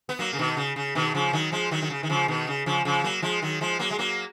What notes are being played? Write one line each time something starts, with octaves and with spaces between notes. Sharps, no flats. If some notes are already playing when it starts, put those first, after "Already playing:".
B3
F#3 A#3
C#3
B2 D#3
C#3
C#3
B2 D#3
C#3 F3
D#3 F#3
F3 G#3
D#3 F#3
D#3
C#3
D#3
C#3 F3
B2 D#3
C#3
C#3 F3
C#3 F3
F#3 A#3
F3 G#3
D#3 F#3
F3 G#3
F#3 A#3
G#3
F#3 A#3